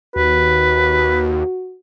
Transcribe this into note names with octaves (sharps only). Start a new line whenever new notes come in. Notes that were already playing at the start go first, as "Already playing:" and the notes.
D#2 F#4 B4